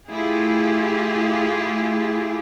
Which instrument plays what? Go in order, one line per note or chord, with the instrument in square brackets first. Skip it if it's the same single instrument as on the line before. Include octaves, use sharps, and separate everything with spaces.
[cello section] A3 E4 F4 G4 G#4